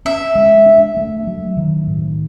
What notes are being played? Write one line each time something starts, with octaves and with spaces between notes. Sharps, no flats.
C#4 E5
G#3
D4
A3
F#3
D#3
A2